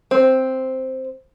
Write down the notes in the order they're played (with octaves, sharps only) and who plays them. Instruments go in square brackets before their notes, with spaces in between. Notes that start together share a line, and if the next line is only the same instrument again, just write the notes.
[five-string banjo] C4